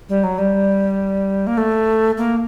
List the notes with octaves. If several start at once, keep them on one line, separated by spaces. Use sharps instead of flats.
G3
F#3
G3
A#3
A3
A#3